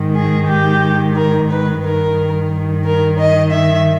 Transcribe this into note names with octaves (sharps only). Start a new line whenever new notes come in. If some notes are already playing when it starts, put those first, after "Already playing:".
Already playing: G#2 D#3
G#4
G4
A#4
B4
G2 D#3 A#4
A#4
D#5
E5